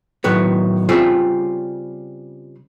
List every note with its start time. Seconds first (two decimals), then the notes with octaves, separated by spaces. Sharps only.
0.24 A2 D#3 F#3 B3
0.89 C#3 G3 C4 F4 E5